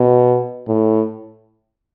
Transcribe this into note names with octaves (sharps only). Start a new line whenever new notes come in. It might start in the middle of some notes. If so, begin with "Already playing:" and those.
Already playing: B2
A2